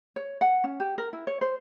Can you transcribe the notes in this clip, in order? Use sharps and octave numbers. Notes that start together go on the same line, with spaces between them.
C#5
F#5
C#4
G4
A#4
E4
C#5
C5